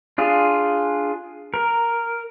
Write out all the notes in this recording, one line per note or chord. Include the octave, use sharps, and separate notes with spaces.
D4 F4 G#4
A#4